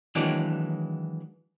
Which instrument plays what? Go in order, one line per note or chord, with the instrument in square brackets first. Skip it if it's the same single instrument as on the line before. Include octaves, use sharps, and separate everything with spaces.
[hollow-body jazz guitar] D#3 E3 F#3 G#3 A#3 D4